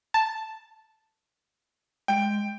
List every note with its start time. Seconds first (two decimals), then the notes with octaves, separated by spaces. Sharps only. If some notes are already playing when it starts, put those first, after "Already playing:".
0.14 A5
2.08 G#3 G5 D7